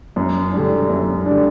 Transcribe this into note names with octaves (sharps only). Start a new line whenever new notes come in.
F#2
D3 G3 D4
F#2
D3 G3 D4